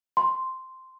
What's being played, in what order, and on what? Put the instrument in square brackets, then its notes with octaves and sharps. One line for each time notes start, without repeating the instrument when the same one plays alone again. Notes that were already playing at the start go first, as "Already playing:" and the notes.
[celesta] C6